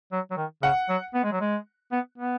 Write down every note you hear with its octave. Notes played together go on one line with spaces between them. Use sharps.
F#3
F#3
D#3
C#3 F#5
F#3
B3
G#3
F#3
G#3
B3
B3